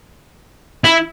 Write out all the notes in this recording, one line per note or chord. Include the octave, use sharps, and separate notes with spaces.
E4